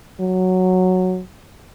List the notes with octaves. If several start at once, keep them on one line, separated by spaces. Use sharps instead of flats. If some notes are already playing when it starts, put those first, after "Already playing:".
F#3